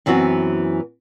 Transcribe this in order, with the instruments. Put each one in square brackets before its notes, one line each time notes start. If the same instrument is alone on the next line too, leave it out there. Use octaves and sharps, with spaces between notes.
[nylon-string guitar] F#2 E3 B3 C4 F#4